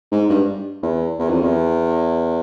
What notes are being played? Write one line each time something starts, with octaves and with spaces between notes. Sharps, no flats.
G#2
G2
E2
E2
F2
E2